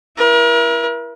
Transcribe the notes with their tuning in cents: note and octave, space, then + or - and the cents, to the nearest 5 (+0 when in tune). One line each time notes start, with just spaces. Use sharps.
E4 +20 A#4 +40